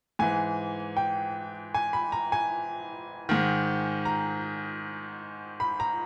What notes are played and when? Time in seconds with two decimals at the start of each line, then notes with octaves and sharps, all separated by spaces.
0.19 G#2 E3 G#5
0.97 G5
1.74 G#5
1.93 B5
2.12 A#5
2.32 G#5
3.29 G#2 D#3
4.05 A#5
5.60 B5
5.80 A#5